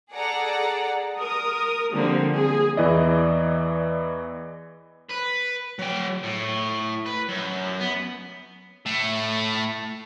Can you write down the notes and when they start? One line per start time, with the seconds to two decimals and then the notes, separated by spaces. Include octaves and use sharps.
0.13 G#4 A4 D5 F#5 A#5
1.18 A#4 D#6
1.93 D3 F3 G3 A#3 C4
2.32 G#4
2.77 E2 E3 E4 D5 D#5
5.10 B4
5.79 F#3 G5
6.23 A2
7.06 B4
7.28 F#2
7.80 B3
8.86 A2 A3